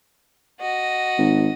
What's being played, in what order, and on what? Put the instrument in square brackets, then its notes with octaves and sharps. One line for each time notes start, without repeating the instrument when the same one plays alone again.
[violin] F#4 D#5
[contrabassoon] G#1